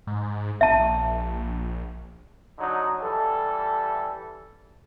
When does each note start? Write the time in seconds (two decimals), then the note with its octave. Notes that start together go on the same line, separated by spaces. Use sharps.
0.07 G#2
0.61 A#1 E5 A5
2.59 D3 F#3 D#4
3.01 E3 G3 A4